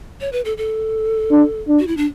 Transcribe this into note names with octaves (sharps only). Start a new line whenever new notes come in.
C#5
B4
A4
A4
D4
D4
F#4
E4
D4